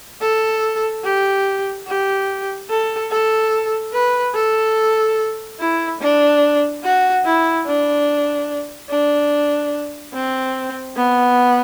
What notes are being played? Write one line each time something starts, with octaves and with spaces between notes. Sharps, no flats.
A4
G4
G4
A4
A4
B4
A4
E4
D4
F#4
E4
D4
D4
C4
B3